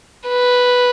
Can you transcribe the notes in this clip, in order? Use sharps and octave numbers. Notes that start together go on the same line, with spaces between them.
B4